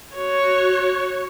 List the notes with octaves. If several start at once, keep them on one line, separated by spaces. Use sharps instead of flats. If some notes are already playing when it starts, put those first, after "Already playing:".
F#4 C#5